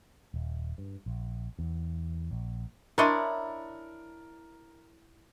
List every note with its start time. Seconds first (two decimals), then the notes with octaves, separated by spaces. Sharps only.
0.34 D#1
0.78 G2
1.06 A#1
1.59 E2
2.31 A#1
2.98 D4 E4 A#4 C#5 D#5 C6 A6 C#7